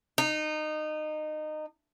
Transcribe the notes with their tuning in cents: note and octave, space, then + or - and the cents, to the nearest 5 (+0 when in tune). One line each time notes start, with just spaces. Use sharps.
D#4 -20